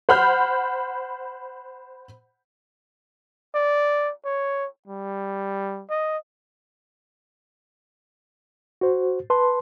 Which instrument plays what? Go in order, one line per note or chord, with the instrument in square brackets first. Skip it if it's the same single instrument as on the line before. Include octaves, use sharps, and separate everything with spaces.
[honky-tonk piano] C5 F#5 B5 F6 G6
[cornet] D5
C#5
G3
D#5
[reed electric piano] F#4 C5
B4 A5 C6